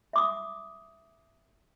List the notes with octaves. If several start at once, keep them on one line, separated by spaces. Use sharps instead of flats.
E5 D6 D#6